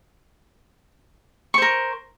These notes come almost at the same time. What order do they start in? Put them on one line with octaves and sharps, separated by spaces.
C#6 C5 A#4